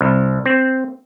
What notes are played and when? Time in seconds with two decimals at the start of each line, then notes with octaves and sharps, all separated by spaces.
0.01 C2
0.46 C4